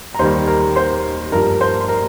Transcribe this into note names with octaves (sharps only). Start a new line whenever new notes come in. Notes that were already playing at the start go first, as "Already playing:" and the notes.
A#5
D#2 D#3 G3 C5 C6
A#4 A#5
C5 C6
G2 F3 A#4 A#5
C5 C6
C6
A#4 A#5